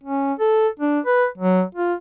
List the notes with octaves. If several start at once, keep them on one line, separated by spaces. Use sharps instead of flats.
C#4
A4
D4
B4
F#3
F4